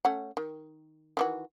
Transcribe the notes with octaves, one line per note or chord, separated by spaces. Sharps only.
A3 C#4 F#5
D#3
D#3 E3 F#4